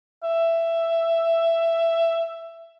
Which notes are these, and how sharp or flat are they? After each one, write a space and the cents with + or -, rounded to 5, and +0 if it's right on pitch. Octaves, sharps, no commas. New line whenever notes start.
E5 +15